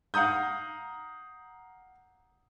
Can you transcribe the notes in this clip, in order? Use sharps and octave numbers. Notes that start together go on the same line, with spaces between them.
F5 F#5 A#5 D#6 G6